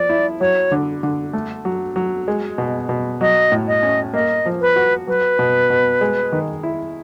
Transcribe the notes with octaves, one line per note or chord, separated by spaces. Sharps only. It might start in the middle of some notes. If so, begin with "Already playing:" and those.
Already playing: F3 D5
E4
F#3 C#5
D3
D3
A3
F#3
F#3
G#3
B2
B2
F#3 D#5
A2
D#5
C#4
A#3 D#5
F3
B4
F#4
F#3 B4
B2
B2
G#3
D#3
E4